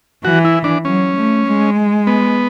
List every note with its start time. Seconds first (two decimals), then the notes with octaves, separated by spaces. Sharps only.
0.24 E3 F#4
0.45 E4
0.64 D4
0.85 F#3 C#4
1.16 A3
1.46 G#3
2.07 B3